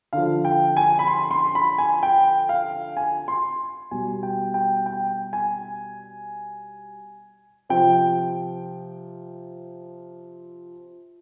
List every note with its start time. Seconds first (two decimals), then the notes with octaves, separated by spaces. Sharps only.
0.13 D3 F3 F5
0.45 G5
0.77 G#5
0.99 B5
1.08 C6
1.31 C6
1.55 B5
1.78 G#5
2.03 G5
2.49 F5
2.97 G#5
3.28 C6
3.91 B2 G3 G#5
4.23 G5
4.54 G5
4.86 G5
5.33 G#5
7.69 C3 F3 G5